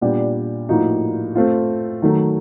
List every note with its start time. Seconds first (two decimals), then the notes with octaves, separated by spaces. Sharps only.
0.01 A#2 G3 B3 D4 G4
0.69 A2 F3 A#3 D#4 F#4
1.35 A3 C4 F4
2.02 D#3 F#3 A3